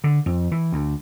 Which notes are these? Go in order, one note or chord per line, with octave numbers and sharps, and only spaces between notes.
D3
F2
E3
D2